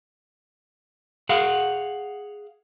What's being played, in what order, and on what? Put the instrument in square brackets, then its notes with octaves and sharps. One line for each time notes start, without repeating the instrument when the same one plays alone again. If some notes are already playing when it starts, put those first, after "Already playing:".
[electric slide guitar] G#4 F5 F#5